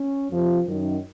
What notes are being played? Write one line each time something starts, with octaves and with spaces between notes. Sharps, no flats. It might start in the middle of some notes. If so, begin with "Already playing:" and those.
Already playing: C#4
F2 C3 F3
F#2 D#3